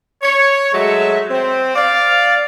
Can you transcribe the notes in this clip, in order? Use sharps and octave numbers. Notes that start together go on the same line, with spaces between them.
C#5
F#3 G#3 A3 E5
C4
D5 F5